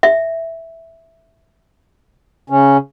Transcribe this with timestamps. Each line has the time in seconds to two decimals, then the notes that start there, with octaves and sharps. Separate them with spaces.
0.03 E5
2.50 C#3 C#4